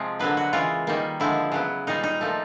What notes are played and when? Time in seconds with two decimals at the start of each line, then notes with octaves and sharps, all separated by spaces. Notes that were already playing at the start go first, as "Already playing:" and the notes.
Already playing: C3 F3 G#3
0.19 D3 F#3 A#3 B4
0.37 F#4
0.53 C#3 E3 G#3 F4
0.87 D#3 G3 A#3
1.20 D3 F3 G#3 E4
1.52 C#3 F#3 B3
1.87 A#2 G3 A#3 D#4
2.03 D#4
2.21 A#2 F3 A3